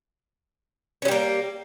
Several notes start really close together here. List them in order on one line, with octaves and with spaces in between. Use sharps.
C#4 F#3 G3 A#3